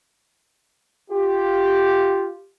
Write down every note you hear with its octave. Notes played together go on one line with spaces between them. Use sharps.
F4 G4